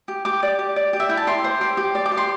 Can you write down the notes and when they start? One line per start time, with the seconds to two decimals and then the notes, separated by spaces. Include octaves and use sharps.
0.08 G4
0.25 G4 D6
0.43 D5
0.59 G4
0.76 D5
0.93 G4
1.00 E5
1.09 E4 G5
1.17 A5
1.27 G4 C6
1.44 C5
1.61 G4
1.77 G4
1.95 D5
2.06 D6
2.12 G4
2.17 C6